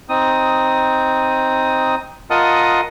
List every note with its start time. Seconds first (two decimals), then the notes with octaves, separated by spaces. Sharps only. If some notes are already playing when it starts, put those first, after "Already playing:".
0.09 C4 D#4 D#6
2.30 F4 A#4 D#5 F#5 A5 D#6